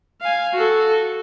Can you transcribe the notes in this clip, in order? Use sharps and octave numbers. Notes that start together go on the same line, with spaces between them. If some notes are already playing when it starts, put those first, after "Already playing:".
F5 G#5
F#4 A4